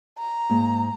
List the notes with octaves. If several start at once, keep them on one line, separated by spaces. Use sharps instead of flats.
A#5
G#2 A#3